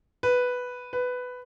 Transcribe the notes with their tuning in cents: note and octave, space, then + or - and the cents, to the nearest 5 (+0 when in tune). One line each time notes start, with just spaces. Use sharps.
B4 +0
B4 +10